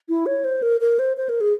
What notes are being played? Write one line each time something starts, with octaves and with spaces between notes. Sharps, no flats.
E4
C#5
C5
A#4
A#4
C5
C5
A#4
G#4